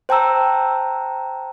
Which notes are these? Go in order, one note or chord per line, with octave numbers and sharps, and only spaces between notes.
C5 G5 A5 A#5 E6